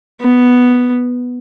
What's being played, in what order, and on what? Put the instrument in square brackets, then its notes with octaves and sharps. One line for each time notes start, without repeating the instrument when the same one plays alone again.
[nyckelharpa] B3